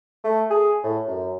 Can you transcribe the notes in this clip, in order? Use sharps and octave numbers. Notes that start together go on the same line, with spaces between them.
A3
G#4
A2
F#2